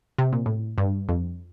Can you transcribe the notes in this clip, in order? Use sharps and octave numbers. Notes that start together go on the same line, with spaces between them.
C3
A#2
A2
G2
F2